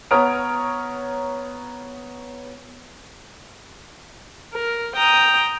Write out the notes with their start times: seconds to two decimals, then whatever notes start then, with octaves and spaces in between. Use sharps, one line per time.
0.11 B3 C#5 A#5 D#6 F6 D7
4.53 A#4
4.96 G5 A#5 D#6